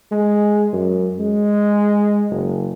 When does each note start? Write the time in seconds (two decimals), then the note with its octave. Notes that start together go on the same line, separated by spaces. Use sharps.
0.11 G#3
0.73 F#2
1.19 G#3
2.30 F#1